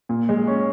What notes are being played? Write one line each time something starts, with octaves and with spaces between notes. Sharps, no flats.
A#2
G#3
C#4